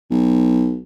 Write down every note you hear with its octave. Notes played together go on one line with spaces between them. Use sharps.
B1